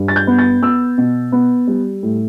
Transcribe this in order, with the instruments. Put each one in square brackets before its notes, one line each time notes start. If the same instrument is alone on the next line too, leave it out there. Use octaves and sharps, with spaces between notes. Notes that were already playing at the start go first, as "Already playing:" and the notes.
Already playing: [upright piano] G2
A6
G6
B3
A6
B3 E6
B2
B3
G3
A2